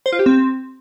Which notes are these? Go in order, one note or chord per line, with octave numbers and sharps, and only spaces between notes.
C5
F4
G4
C4